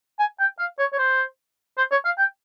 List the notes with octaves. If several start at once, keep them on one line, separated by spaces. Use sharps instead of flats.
G#5
G5
F5
C#5
C#5
C5
C5
C#5
F5
G5